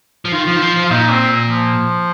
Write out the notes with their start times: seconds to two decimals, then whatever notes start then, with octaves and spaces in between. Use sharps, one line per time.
0.25 F3
0.32 D#3 F4
0.47 F3
0.56 D#3
0.62 F3
0.76 F3
0.86 F4
0.90 A#2 D#4
1.10 C4
1.48 F3